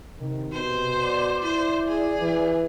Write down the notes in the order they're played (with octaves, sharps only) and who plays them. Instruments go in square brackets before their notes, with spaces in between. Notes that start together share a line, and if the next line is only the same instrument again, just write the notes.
[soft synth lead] C3 [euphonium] D#3
[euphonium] B2 [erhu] C5
[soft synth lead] D5
[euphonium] E4 [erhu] C5
[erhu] G#4
[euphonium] E3